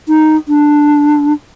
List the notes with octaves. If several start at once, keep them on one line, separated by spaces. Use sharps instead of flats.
D#4
D4